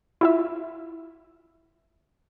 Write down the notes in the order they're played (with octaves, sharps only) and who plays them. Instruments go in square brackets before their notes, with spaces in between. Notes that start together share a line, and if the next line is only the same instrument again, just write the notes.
[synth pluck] E4 F4 E5